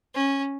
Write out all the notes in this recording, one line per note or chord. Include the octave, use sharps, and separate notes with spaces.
C#4